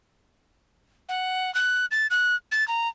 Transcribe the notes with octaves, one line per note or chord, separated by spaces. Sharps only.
F#5
F#6
A6
F#6
A6
A#5